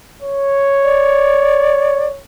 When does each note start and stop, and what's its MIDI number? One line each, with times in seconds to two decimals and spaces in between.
0.22 2.20 73
0.84 2.07 74